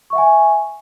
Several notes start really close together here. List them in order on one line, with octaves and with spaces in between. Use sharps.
C#6 E5 F#5 G#5